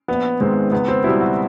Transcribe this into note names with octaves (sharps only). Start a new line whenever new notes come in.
A#1 B3
G#2 D#3 G#3 B3 C4
C#2 B3
C4
B2 G3 B3 E4
F#4